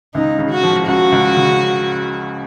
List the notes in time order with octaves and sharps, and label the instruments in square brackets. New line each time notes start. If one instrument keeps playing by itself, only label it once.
[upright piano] C#2 [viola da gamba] D#4
[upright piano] C#3
[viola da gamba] F#4
[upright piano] F3
[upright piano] C#2 [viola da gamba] F#4
[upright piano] C#2
C#3